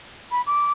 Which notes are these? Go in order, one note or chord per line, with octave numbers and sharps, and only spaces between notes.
B5
D6